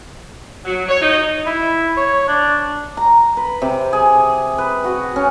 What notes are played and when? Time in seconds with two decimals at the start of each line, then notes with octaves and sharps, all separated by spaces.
0.65 F#3
0.88 C#5
1.01 D#4
1.47 E4
1.97 C#5
2.28 D4
2.97 A#5
3.37 B4
3.62 C3
3.93 G#4
4.58 B4
4.84 F#4
5.16 C#4